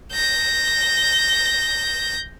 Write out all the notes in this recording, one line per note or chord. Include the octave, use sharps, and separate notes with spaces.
G6 A#6